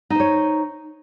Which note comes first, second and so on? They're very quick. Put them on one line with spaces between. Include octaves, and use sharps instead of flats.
D#4 C5 C#5